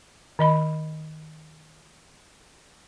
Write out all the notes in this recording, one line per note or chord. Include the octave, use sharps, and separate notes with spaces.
D#3 D#5 B5